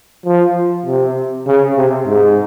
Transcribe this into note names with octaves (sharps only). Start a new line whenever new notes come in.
F3
C3
C#3
C3
G#2